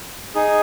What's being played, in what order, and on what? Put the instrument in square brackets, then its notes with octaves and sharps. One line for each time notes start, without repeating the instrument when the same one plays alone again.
[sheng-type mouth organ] D#4 G#4